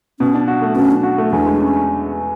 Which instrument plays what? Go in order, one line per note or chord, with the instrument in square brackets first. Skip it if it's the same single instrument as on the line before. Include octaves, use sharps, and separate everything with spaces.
[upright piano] B2 [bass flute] C#4
[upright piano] D4
F#4
A3
[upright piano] B2 [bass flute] C#4
[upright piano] D4
F#4
A3
[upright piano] E2 [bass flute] D4
[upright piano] G#3
C#4